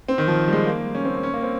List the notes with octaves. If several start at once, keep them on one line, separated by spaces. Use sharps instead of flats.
C4
D#3
F3
G3
G#3
A#3
C#4
C4
A#3
C#4
A#3
C4